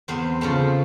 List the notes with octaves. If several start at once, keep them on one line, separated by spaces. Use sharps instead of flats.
E2 C4 C5
C#3 F3 A3 C4